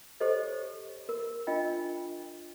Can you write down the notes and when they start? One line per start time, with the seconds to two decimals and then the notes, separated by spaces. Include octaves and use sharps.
0.20 G4 A4 C5 C#5 D#5
1.09 A#4
1.47 D4 F4 D#5 G5